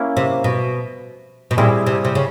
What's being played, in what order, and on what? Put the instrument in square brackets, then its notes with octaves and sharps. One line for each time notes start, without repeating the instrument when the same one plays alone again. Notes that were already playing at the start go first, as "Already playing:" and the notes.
Already playing: [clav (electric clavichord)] A#3 C#4 E4
[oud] C3
B2
B2
[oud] A#2 [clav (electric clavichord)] G3 C4 E4 G#4
[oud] C3
C3
C#3